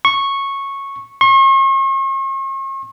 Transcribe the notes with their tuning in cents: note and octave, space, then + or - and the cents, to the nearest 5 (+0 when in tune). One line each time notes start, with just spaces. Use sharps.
C#6 -10
C#6 -45